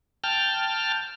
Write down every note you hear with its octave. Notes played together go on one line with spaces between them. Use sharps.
G5 A5 F6